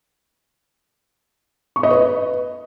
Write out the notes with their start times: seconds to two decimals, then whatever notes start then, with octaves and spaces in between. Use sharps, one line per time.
1.76 C#6
1.83 D#5
1.91 B4